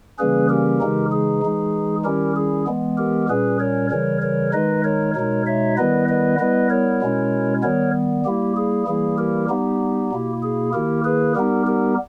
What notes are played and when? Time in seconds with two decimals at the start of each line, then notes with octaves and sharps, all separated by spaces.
0.18 C#3 E3 G3 A#3 C#4 G#4 B4
0.50 G4 A#4
0.81 C#3 E3 G#3 D#4
1.12 G#4
1.43 E3 G#3 D#4
2.05 D#3 G3 C#4 E4 G4 A#4
2.36 G#4
2.67 E3 G#3 B3
2.98 G4 A#4
3.29 A#2 G3 C#4 G#4 B4
3.60 A#4 C#5
3.91 C#3 E3 G3 A#4 C#5
4.22 A#4 C#5
4.53 D#3 G#3 D#4 B4 D#5
4.84 A#4 C#5
5.15 B2 G#3 D#4 A#4 C#5
5.46 C#5 E5
5.77 D#3 G3 B3 E4 B4 D#5
6.08 B4 D#5
6.39 G3 B3 E4 B4 D#5
6.70 A#4 C#5
7.01 B2 G#3 C#4 E4
7.63 D#3 G3 B3 A#4 C#5
8.25 G3 A#3 E4 G4
8.57 G#4
8.87 E3 G3 A#3 E4 G#4
9.18 G4 A#4
9.49 G3 B3 D#4 G4
10.12 B2 A#3 E4
10.43 G#4
10.73 D#3 A#3 E4 G4 A#4
11.04 G#4 B4
11.36 G3 B3 D#4 G4 A#4
11.67 G4 A#4